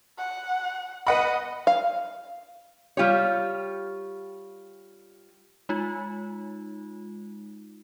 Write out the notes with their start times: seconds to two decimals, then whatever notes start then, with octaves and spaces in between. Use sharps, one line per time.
0.18 F#5
1.07 B4 D#5 F#5 B5
1.67 F5
2.97 G3 F4 G4 C#5
5.69 G#3 D#4 F4